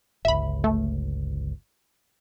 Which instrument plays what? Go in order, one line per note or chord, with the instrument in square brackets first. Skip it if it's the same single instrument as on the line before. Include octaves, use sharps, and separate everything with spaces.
[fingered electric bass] G1 C#2 [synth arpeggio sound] E5 B5
[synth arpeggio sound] A3